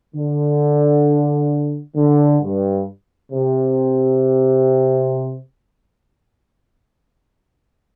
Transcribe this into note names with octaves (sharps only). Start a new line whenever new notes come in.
D3
D3
G2
C3